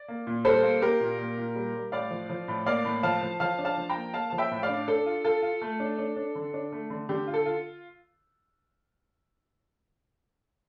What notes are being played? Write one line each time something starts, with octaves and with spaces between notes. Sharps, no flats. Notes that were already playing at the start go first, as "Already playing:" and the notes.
Already playing: D5
A#3
A#2
G3 A4 C5
A#3
A#3 G4 A#4
A#2
A#2
A#2
G3
G3
A2 D5 F5
F3
F3
A2
A#3 D5 F5
A2
F3 F5 A5
F3
F3 F5 A5
D4
F5 A5
F3
G5 A#5
A#3
A#3 F5 A5
F3 A5
E5 G5
A2
D5 F5
D4
D4 A4
F4
F4 A4
F4
A3
D4
D4
D4
D3
D4
A3
D3
D3 G4
F4
A4
F4